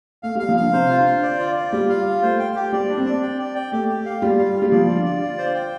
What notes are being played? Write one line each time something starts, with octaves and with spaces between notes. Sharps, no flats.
A3 F5
G3 F5
F3
D3 F5
C3 C5
F4
D3
C5
D5
F4
D5
G3 F4
F5
F4
A3 C5
G5
G4
G3 D5
D4
C4
D5
G5
D5
G5
A3 G4
G4
F5
G3 F4
F5
F4
G3
F3 D5
F4
D3
D5
F4
C5
G5